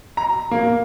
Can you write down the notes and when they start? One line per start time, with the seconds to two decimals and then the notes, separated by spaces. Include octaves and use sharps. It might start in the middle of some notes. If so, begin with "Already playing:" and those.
0.17 A#5
0.51 A#3